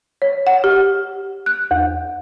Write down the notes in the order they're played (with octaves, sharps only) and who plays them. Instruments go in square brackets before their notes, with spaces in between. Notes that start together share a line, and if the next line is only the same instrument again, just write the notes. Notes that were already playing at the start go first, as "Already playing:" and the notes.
[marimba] C#5
F#5
G4
F#6
E2